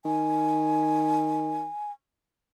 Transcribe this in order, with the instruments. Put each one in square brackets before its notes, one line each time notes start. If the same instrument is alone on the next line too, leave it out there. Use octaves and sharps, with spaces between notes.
[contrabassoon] D#3 [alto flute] G#5